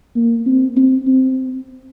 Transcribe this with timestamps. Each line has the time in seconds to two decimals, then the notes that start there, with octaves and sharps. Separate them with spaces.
0.16 A#3
0.46 C4
0.77 C4
1.07 C4